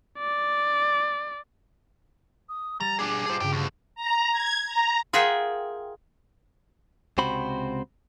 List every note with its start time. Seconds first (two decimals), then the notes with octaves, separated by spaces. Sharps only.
0.18 D5
2.49 D#6
2.80 G3 A#5 A6
2.99 D4 G#4 D6
3.26 F4 G#4 C5 G5 A5
3.41 G2 C#3 F#4 G5
3.53 D2
3.95 A#5
4.32 G#6
4.66 A#5
5.13 F4 G#4 A#4 E5 F#5 G5
7.18 C#2 C3 C4 F#4 C5 B5